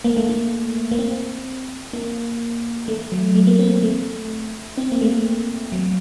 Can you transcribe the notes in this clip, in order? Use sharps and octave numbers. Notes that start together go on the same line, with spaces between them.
A#3
A3
A#3
A#3
C4
A#3
A3
F#3
A3
A#3
C4
A3
C4
A#3
A3
F#3